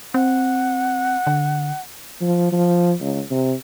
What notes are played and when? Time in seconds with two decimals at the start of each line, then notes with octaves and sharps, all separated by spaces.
0.14 C4 F#5
1.27 D3
2.21 F3
2.52 F3
3.00 C#2
3.31 C3